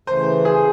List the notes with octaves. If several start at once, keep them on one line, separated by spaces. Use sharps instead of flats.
C#3 E3 A3 C5
G#4